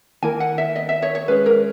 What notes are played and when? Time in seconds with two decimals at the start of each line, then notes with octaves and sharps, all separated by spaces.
0.23 D#3 A#3 E4 A#4 G#5
0.40 F#5
0.58 E5
0.76 D#5
0.89 E5
1.02 C#5
1.15 C#5
1.28 G#3 C#4 G#4 B4 C#5
1.46 A#4